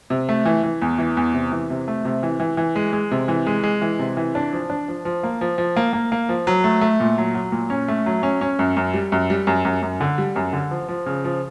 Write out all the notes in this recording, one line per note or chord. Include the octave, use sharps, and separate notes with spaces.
C3
A3
E3
E3
E2
E3
E2
C3
E3
C3
A3
C3
E3
E3
E3
G#3
G#3
C3
E3
G#3
G#3
E3
C3
E3
D4
F3
D4
F3
F3
A#3
F3
F3
A#3
A#3
A#3
F3
F#3
A3
A3
A#2
F#3
F#3
A#2
C#4
A3
F#3
C#4
C#4
F#2
F#2
G3
F#2
G3
F#2
F#2
F#2
D3
G3
F#2
D3
F3
F3
C#3
F3